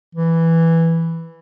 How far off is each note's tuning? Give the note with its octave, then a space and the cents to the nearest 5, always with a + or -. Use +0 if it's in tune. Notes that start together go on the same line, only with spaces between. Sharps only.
E3 +0